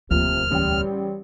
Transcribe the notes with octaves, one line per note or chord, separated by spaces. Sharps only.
E1 D2 C3 F3 A#3 F6
A1 C#3 G3 G5